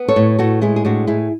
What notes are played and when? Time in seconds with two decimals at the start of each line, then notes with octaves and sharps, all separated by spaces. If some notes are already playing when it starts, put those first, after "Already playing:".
Already playing: B3
0.08 A4 C#5
0.16 A2
0.39 A2 F#4 A4
0.61 G#3 E4 G#4
0.76 G#4
0.85 A2 D4 F#4
1.07 A2 E4 G#4